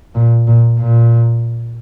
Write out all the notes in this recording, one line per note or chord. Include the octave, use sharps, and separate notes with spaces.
A#2
A#2
A#2